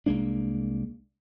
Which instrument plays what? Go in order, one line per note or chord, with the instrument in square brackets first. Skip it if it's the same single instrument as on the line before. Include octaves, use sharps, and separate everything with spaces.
[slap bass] C2 G#3 A#3 D4